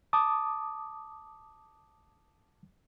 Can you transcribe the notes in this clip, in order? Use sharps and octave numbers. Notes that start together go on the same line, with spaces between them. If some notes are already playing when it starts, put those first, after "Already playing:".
A5 D6 D#6